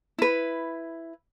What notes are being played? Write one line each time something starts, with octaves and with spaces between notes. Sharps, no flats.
E4 B4